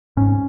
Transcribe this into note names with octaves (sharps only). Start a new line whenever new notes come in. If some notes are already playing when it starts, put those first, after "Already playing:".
G#2 C#4